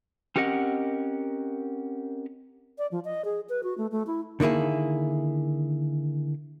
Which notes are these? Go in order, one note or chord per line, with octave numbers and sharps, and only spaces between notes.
C4 C#4 G4 A#4 D#5 F#5
D5
F3
D#5
G#4
B4
F#4
A3
A3
E4
D3 D#3 A#3 E4 G#4